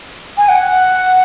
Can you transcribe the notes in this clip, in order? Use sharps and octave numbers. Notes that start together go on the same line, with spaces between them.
G#5
F#5